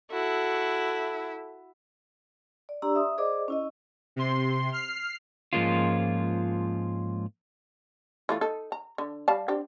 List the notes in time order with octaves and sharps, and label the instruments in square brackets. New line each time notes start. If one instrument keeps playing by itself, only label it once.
[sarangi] E4 [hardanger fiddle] F#4 [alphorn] A4
[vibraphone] D5
D4 G4 D5 A#5 C6 E6
E5 D#6
G#4 C5 D5 D#5 D6
C#4 E4 D#5
[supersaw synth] C3 C6
F6 C7
[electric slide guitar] G#2 F3 G#3 A#3 C#4 F4
[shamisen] E3 A3 F4
D#4 A4
A#5
D3
G3 F5 A5
C4 D4 G4